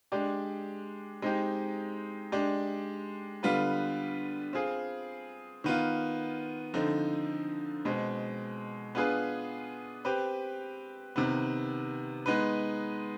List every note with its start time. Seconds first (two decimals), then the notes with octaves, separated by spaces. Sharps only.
0.12 G#3 D4 G4 D5
1.22 G#3 C4 D#4 G4
2.32 G#3 D4 G4 D5
3.43 D3 G3 B3 F4 B4
4.53 C4 F4 G#4
5.64 D#3 B3 F4
6.74 D3 F3 C4 D#4
7.85 B2 G#3 C4
8.95 B3 D4 F4 G#4 B4
10.05 C4 G4 B4
11.16 C3 D#3 B3
12.26 G#3 B3 D#4 B4